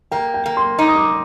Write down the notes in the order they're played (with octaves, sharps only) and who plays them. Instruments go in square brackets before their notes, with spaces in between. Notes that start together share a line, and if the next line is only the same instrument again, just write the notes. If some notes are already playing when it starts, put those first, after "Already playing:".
[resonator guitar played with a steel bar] A#3 [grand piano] G5
[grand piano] G5
[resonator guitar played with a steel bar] A#3
[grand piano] C6
[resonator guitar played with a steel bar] D#4 [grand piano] D6
[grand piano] D#6
D6